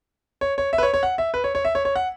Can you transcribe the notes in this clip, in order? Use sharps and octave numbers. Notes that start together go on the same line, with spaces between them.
C#5
C#5
E5
B4
C#5
C#5
F#5
E5
B4
C#5
C#5
E5
C#5
C#5
F#5